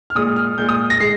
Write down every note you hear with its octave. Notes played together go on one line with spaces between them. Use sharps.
F6
A#2 G#3 D#6
F6
A#2 G#3 G6
D#6
A#6
G#3 C7